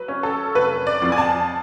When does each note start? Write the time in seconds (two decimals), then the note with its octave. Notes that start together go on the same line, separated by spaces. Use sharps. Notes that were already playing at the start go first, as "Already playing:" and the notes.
Already playing: F#3 B4
0.08 C#4
0.23 A4
0.55 F1 B4
0.87 D5
1.02 F2
1.12 G#5
1.18 A5